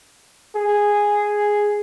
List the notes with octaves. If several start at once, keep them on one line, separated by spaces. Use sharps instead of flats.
G#4